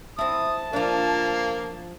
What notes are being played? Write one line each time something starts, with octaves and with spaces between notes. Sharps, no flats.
C4 E4 A5 D#6
F3 A#3 D4